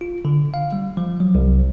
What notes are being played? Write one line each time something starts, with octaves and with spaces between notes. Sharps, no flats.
F4
D3
F5
G3
F3
F#3
C2